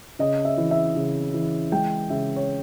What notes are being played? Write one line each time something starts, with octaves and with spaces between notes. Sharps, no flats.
C#3 D#5
E5
E3
E5
C#3
E3
G#3 G5
C#3 E5
C#5